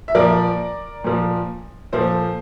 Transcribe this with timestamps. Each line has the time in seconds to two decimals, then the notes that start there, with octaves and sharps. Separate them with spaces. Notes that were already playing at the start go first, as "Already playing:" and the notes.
0.08 E5
0.15 A#2 F3 A#4 D5
1.04 A#2 F3
1.92 A#2 F3 A4 C5